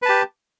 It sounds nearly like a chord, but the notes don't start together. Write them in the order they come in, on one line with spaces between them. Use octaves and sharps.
B4 A5 G4